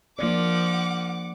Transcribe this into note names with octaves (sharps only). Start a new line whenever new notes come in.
F3 A#3 D4 D5 F#5 D6